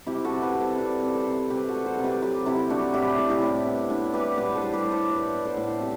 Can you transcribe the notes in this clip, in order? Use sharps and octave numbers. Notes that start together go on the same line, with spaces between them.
C3 E4 G4
F#4 A4
C3
G4 B4
C3
A4 C5
C3 B4 D5
C3
A4 C5
C3
C3 G4 B4
F#4 A4
A3
A4 C5
C3
G4 B4
F#3 G4 B4
C3 E4 G4
A3 D4 F#4
A2 E4 G4
A2
E4 G4
A2
B3
A2 D4
B3 G4 B4
A2 G4 B4
A4 C5
G3
G4 B4
A2
A4 C5
A2 B4 D5
B3
A4 C5
A2
C3 G4